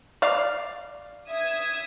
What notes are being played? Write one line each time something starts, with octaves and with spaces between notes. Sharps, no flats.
D5 F5
E5 D#6 G#6